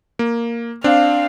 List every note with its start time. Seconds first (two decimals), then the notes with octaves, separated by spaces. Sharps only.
0.19 A#3
0.84 C4 D4 F5